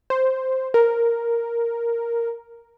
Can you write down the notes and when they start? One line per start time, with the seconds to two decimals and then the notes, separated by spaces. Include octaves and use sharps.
0.10 C5
0.74 A#4